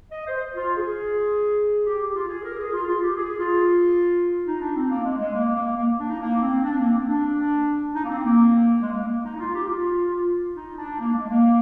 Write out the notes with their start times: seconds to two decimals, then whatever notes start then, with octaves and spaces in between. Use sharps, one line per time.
0.12 D#5
0.27 C5
0.55 F4
0.77 G#4
1.86 G4
2.01 G4
2.15 F4
2.29 G#4
2.44 A#4
2.58 G#4
2.73 F4
2.87 F4
3.02 G4
3.16 G#4
3.39 F4
4.46 D#4
4.61 D4
4.76 C4
4.90 A#3
5.05 G#3
5.19 G#3
5.34 A#3
5.56 A#3
5.77 A#3
5.99 D4
6.10 D#4
6.20 A#3
6.42 C4
6.64 D4
6.79 A#3
6.93 C4
7.08 D4
7.94 D#4
8.04 A#3
8.09 C4
8.24 A#3
8.81 G#3
8.92 A#3
9.03 A#3
9.25 D#4
9.36 D#4
9.40 F4
9.55 G4
9.69 F4
10.56 D#4
10.77 D4
10.99 A#3
11.14 G#3
11.28 A#3